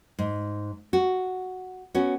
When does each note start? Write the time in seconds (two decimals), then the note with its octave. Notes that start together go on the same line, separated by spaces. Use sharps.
0.19 G#2
0.93 F#4
1.95 B3 C#4 F#4